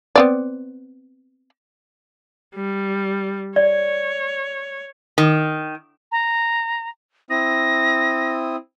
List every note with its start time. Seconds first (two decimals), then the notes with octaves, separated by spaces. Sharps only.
0.16 B3 C4 D5
2.55 G3
3.56 C#5 D5
5.18 D#3
6.12 A#5
7.30 C4 E4 D#6 A#6